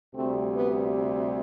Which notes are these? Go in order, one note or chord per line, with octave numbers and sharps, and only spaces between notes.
D2 C3 G3 A3 C4
B3